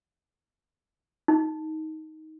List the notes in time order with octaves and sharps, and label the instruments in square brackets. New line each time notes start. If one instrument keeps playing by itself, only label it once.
[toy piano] D#4